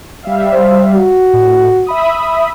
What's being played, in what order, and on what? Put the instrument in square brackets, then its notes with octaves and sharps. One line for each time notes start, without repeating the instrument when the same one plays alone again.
[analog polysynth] G3 E5 F5
[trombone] C5
F#4
[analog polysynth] A2
E5 B5 D#6